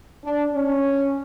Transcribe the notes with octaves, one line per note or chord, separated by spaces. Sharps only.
D4
C#4